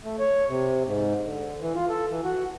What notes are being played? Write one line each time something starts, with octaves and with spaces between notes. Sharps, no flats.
A3
C#5
C3
G#2
D3
E3
F4
A4
E3
F#4